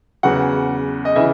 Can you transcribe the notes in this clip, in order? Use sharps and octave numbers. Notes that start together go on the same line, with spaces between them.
E2 C#3 F#3 F#5
D#5
C#3 E3 E5